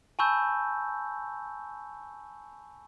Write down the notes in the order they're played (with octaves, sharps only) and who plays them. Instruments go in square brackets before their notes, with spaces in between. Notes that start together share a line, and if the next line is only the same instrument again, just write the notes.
[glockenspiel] G#5 A5 B5 C#6 E6 G6